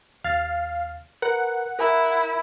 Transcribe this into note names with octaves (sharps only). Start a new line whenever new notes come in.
D#2 F5 A6
A#4 B4 F#5
E4 A#4 B5